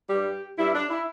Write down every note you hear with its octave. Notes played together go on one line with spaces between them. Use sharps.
G2 G3 G4
G2 G3 E4
D4
E4